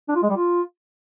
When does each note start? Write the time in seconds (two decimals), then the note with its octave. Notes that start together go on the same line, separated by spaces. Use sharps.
0.08 D4
0.15 F4
0.22 G#3
0.30 G3
0.37 F4